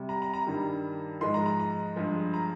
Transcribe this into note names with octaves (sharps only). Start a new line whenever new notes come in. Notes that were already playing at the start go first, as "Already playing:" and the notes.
Already playing: C3 G3
A#5
A#5
A#5
G2 D#3 G3
G#2 F3 G#3 C6
A#5
A#5
A#5
G2 F3 G#3
A#5